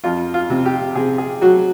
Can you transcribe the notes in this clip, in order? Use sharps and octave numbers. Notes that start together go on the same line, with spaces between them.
F2 F4
F4
C3
G4
C3 G#4
G#4
F#3 F#4